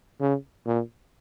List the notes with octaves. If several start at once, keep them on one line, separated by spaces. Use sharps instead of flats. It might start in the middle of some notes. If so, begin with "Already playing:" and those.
C#3
A#2